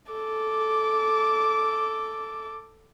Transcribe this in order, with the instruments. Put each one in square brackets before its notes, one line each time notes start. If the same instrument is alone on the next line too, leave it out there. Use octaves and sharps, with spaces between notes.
[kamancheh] A4 D6